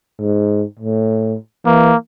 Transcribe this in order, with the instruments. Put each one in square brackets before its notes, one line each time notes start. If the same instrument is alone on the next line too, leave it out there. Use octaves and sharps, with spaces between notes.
[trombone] G#2
A2
[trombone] E3 [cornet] A#3